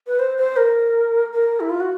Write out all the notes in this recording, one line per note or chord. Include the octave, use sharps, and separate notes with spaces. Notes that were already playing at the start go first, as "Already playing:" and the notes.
B4
C5
C5
A#4
A#4
E4
F4
F#4